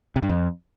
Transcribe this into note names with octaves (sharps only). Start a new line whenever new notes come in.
C3
G2
F2